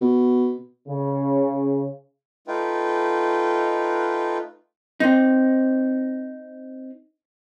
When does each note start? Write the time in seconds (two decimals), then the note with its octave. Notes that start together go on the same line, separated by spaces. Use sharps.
0.02 B2
0.88 C#3
2.47 A3 D#4 F4 B4 G5
5.00 C4 D#4